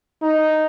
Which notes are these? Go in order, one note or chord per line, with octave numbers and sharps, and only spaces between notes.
D#4